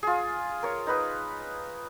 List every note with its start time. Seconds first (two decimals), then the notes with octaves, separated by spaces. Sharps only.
0.03 F4 G#4
0.63 A#4 C#5
0.87 D#4 B4 D#6